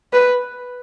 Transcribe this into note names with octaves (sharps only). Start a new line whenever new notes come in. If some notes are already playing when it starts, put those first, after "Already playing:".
B4